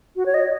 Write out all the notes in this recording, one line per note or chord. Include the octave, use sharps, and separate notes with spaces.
F#4
C#5
D#5